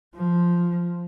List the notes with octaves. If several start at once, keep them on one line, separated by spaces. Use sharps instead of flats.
F3